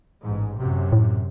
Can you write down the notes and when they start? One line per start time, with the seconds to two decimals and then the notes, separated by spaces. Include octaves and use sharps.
0.23 A1 G#2
0.57 F#2 C3
0.93 A2